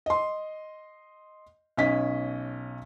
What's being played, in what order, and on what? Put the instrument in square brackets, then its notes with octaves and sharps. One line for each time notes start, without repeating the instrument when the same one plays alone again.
[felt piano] D#5 C6
B1 C#4 D#5 B6